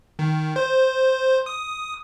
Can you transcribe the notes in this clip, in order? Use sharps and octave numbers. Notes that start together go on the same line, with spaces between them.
D#3
C5
D#6